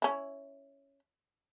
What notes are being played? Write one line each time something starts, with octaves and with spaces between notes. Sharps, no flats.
C#4 E4